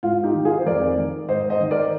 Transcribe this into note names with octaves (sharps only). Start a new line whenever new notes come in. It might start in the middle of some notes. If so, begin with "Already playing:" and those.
G#2 F4
D#4 G4
D#3
F4 G#4
C5
F2 A#4 D5
D#3
G#2 C5 D#5
C5 D#5
D#3
A#4 D5